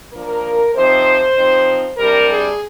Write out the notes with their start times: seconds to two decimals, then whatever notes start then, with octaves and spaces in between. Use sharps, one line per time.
0.13 F3 A#3 D4 A#4
0.74 C3 F3 C4 D#4 C5
1.36 F3 C4 D#4
1.98 C3 G3 D4 A#4
2.29 G#4